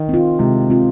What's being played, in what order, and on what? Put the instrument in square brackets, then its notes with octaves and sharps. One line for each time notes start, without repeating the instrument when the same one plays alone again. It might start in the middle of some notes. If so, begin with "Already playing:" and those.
Already playing: [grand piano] D#3
[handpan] C4 F4
[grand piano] C3 [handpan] G#3
[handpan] C4 F4